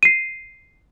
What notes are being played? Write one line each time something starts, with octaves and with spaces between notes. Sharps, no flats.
C7 D#7